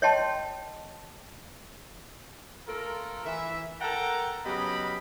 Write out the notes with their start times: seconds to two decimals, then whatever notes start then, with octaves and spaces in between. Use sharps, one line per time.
0.02 C#5 D#5 G5 A5 C6
2.67 A3 F4 A4 A#4
3.25 E3 E5
3.81 A4 A#4 F#5 G5 A5 A#5
4.46 C#3 F#3 B3 G4 D#5 B5